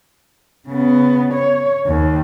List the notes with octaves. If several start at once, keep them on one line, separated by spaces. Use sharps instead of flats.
C#3 B3
C#5
D#2